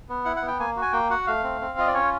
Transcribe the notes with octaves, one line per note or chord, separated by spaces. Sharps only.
B3
E4 F#5
F#5
B3
G5
A#3 G#5
F#4
G#5
A#3 G5
F#4 F#5
A3 F5
C4
C4
F4 D#5
D5
C#4 C#5